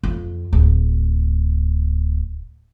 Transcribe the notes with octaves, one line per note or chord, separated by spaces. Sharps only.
F2
D1